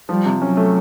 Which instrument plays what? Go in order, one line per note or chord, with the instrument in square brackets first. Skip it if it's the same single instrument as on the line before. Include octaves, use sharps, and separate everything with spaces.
[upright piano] F3 [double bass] G3
[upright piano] C3
[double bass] F#3 [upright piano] C#4
[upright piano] A3